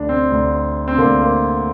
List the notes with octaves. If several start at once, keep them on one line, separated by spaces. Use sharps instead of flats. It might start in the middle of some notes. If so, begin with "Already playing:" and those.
Already playing: D2 D3 D4
C4
D2 D3
C4
D2 D3 A#3
A#3